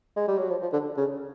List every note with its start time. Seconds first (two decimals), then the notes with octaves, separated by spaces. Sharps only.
0.16 G#3
0.28 G3
0.38 F#3
0.50 F3
0.62 F3
0.73 D3
0.97 C#3